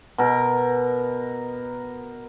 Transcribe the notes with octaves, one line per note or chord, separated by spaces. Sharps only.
B2 A#4